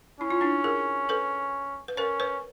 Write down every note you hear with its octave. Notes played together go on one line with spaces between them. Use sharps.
C#4 E4
F4
D4 E4
G#4 A#4
A4 B4
B4
C#4 A#4 C5
B4 C#5